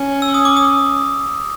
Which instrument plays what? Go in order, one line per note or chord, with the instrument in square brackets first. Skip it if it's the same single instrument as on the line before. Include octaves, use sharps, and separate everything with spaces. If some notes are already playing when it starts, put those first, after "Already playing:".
Already playing: [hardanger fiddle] C#4
[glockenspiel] E6
D#6
D6
D#6